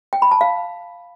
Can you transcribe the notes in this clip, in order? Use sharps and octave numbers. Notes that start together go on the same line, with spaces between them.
G5
B5
A5
F5